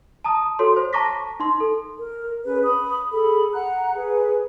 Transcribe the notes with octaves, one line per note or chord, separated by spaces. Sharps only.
A5 A#5 D#6
F#4 A4 C#5 C6
C5
A5 A#5 C#6 D6 A#6 B6
D#4 C6
A4
A#4
C#4 G#4 B4
B5 D#6
G#4 A4 B5
F#5 A#5 F#6
G#4 B4